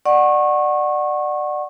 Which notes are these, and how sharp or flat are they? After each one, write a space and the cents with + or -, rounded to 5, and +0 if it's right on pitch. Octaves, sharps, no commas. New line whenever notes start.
D5 +20 F#5 +0 C#6 -25